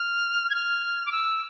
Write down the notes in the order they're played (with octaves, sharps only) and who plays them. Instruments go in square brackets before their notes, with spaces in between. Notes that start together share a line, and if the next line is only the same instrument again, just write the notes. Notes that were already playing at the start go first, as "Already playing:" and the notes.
Already playing: [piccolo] F6
G#6
F6
D6
E6